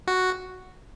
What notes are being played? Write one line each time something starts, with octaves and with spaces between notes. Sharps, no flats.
F#4